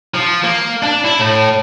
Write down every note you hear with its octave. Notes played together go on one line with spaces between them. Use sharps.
F3
A#3
D4
E4
A2